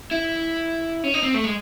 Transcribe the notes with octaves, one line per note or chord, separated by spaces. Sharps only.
E4
C#4
D#4
C4
A3
G#3